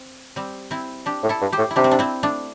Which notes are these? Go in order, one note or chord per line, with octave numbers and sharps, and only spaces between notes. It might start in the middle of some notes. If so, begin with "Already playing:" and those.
Already playing: C4
G3 C4
C4 E4
D4 G4
A2
E4 A4
G2
G4 C5
A2
E4
C3 D4 G4
C4
D4
C4 E4
A3 D4